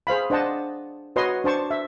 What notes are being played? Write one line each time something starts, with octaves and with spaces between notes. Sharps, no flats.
G#4 C5 F5 B5
D4 C5 D#5 F#5 A5
F#4 B4 C#5 D#5 C6
D4 C5 A5 C#6
E5